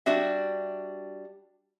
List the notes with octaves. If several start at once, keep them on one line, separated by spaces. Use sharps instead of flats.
G3 D4 F#4 E5